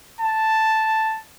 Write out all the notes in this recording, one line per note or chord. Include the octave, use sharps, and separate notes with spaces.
A5